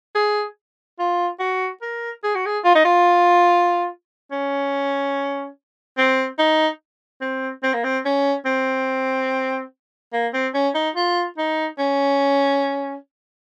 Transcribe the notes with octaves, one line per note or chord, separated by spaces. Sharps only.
G#4
F4
F#4
A#4
G#4
F#4
G#4
F4
D#4
F4
C#4
C4
D#4
C4
C4
A#3
C4
C#4
C4
A#3
C4
C#4
D#4
F4
D#4
C#4